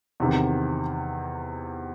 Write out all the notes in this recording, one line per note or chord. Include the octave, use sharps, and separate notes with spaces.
E2 C3 D#3